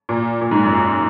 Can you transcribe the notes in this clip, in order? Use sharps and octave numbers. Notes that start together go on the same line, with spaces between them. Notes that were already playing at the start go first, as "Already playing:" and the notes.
A#2
A#2
G#2
F#2